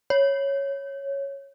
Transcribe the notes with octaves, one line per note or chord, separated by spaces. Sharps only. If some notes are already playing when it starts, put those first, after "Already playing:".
C#5